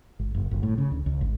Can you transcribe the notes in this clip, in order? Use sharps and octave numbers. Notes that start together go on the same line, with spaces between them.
G#1
F#1
G1
A2
C#3
D2
C#2
G#1